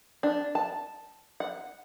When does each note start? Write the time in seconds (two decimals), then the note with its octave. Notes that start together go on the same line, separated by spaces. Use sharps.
0.23 D4
0.55 A5
1.40 F#5